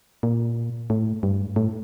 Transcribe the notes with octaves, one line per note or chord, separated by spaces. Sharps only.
A#2
A2
G2
A2